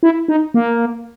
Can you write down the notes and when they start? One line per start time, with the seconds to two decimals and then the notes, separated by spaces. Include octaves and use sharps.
0.03 E4
0.28 D#4
0.54 A#3